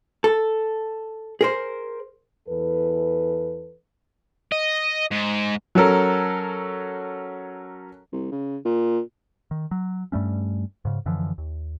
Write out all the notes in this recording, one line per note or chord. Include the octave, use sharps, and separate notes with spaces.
A4
G#4 A#4 C5
E2 E3 A4 B4
D#5
G#2
F#3 C#4 F#4 A4 A#4
C2
C#3
A#2
D#3
F#3
G2 G3 A3 C#4
G#2 C#3
F#2 D3 E3 F3
D#2